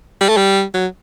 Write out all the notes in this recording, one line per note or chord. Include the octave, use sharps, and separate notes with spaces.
G3
A3
G3
F#3